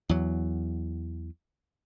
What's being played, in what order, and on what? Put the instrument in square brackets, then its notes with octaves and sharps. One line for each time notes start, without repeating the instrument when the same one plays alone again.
[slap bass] E2 F#3